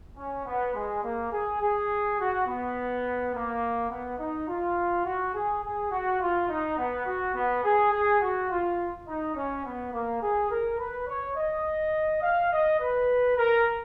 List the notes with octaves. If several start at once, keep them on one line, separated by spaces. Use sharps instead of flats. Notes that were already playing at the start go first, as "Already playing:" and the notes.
C#4
B3
G#3
A#3
G#4
G#4
F#4
B3
A#3
B3
D#4
F4
F#4
G#4
G#4
F#4
F4
D#4
B3
F#4
B3
G#4
G#4
F#4
F4
D#4
C#4
B3
A#3
G#4
A#4
B4
C#5
D#5
F5
D#5
B4
A#4